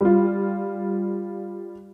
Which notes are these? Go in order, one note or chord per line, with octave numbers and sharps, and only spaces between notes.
G3 F4